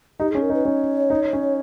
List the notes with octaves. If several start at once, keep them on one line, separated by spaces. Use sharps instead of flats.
D#4 G4
G#4
C#4
A#4
D#4
B4
C#4 C#5
D#4
C#4